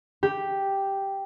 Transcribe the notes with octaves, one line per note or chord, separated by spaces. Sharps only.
G4